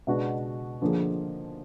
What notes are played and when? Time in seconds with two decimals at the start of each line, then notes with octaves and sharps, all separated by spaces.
0.07 B2 G#3 B3 D4 F#4
0.82 D3 F3 A#3 D4 G#4